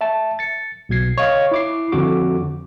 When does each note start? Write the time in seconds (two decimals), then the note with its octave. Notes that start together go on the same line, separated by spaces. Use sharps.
0.01 E5 A5
0.39 A6 C#7
0.89 B1 B2 G#6 C7
1.18 C#5 D#5 F5 C#6
1.51 E4 D6 C7
1.92 F2 D3 F#4 D6